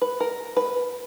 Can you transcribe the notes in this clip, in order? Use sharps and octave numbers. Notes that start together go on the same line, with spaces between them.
B4
A#4
B4